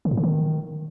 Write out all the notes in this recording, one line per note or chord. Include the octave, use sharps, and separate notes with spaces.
D3
A2
D3
D#3